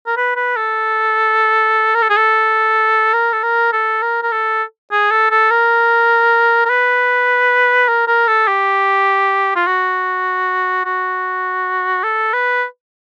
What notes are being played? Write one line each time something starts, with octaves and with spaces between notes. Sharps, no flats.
A#4
B4
B4
A4
A#4
A4
G#4
A4
A#4
A4
A#4
A4
A#4
A#4
A4
G#4
A4
A4
A#4
A#4
B4
A#4
A#4
A4
G4
F4
F#4
F#4
A4
B4